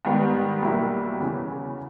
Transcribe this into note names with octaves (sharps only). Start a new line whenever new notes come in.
G#2 D#3 G3 B3
B1 B2 G3 A#3 E4
E2 C#3 E3